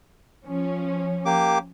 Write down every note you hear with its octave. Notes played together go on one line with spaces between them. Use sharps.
F3 C#4
A#3 G4 D6